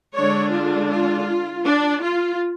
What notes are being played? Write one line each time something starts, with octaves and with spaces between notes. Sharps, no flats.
D3 G#3 D4 C#5
F4
F4
D4
F4